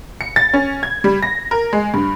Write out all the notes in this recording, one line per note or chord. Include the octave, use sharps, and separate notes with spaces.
C#7
A6
C#4
G#6
G3
A#6
A#4
G#3
G2